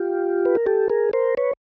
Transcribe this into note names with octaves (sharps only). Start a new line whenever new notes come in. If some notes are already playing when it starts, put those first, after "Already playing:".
Already playing: F4 G4
B4
A#4
G4 A4
G#4 A#4
A#4 C5
B4 C#5